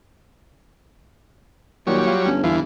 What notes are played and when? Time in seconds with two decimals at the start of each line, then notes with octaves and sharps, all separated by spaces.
1.87 A#2 D#3 F#3 G3 C#5
2.07 F4
2.26 G1 C#4
2.44 E2 E3 F4